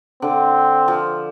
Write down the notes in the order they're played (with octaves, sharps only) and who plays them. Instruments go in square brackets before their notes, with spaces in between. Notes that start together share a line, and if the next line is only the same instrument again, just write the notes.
[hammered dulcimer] D3 [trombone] C4
[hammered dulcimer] F3